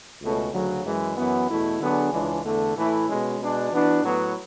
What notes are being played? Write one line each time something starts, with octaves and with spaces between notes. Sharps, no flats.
C#2 B2 A3 C#4
D2 C#3 F#3
F#2 E3 G#3
F#2 E3 B3
E2 B2 A3 E4
D3 F#3 B3 D4 G#4
C#2 C#3 E3 G#3 D4
E2 D3 A3
A2 E3 A3 E4
B2 G#3 C#4
B2 G#3 D4
E3 B3 D4 F#4
A2 F#3 B3